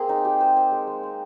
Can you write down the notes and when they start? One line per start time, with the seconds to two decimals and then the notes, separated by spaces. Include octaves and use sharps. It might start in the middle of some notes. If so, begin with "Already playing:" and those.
Already playing: A#3 C4 G#4 A#4 C5
0.09 D#4
0.25 G4
0.41 C5
0.57 C5
0.72 G#3
0.87 G#3
1.03 C4